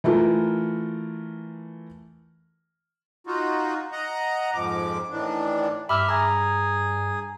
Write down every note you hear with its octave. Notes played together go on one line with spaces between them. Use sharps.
E3 A3 F4 A#4
D#4 F4 F#4
D#5 F#5 A#5
F2 G#2 F3 D6
A2 D#3 E3 D4
G2 G4 E5 B5 F6
G#4 A#5